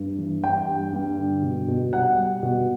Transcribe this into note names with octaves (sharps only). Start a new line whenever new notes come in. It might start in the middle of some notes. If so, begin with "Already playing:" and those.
Already playing: G2
E3
G2 G5
G3
G2
D3
B2
B2
G3 F#5
G3
B2